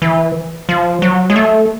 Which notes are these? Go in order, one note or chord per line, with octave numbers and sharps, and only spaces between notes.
E3
F3
F#3
G#3
A3